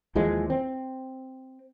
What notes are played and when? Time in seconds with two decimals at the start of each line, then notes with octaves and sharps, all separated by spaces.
0.15 D#2 E3 F3 G#3
0.50 C4